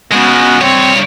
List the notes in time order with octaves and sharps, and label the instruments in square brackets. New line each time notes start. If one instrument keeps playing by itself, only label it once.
[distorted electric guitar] C#3 G#3 [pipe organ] B3 F#4
[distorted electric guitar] G2 C#5 [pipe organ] C4